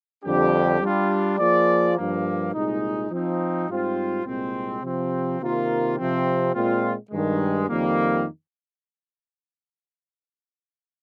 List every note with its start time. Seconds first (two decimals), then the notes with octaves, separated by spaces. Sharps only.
0.24 F2 D3 G3 D4 G4
0.81 G3 D4 F4
1.39 F3 A#3 F4 G#4 D5
1.96 G2 F3 A#3
2.53 C2 A#2 G#3 D#4
3.11 F3 C4 D#4
3.68 G#2 G3 C4 F4 C5
4.25 C2 A#2 G#3 C4
4.82 C3 F3 C4
5.40 C3 D#3 A#3 F4 A#4
5.97 C3 F3 C4
6.54 A#2 G#3 C4 F4
7.11 G2 D#3 G#3
7.69 F2 D#3 G3 A#3